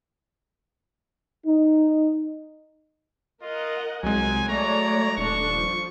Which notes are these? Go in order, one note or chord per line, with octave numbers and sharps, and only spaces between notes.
D#4
F4 A#4 D#5 F#5
C2 F#3 G#3 G#5
A3 C#5 D5 A#5
D#1 A3 D4 A4 C#6
F3